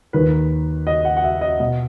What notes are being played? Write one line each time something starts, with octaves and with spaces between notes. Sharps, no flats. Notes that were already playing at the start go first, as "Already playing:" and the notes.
D#2 D#3 B4
D#5
F#5
F#5
E5
D#5
B2 D#5